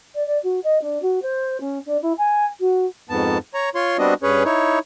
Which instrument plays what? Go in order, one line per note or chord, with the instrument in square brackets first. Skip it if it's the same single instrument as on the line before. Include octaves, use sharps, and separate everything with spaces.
[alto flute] D5
D5
F#4
D#5
D4
F#4
C5
C#4
D4
E4
G#5
F#4
[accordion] F2 G#2 B3 A5
C#5 A#5
F4 C#5 C6
G3 B3 C4 D4 F#4 D#5
G2 C#4 G#4 B4 C#5
D#4 E4 C#5